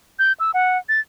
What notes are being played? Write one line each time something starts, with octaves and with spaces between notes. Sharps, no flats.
G6
E6
F#5
A6